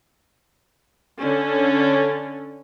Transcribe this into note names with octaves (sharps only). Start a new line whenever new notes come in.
D3 C#4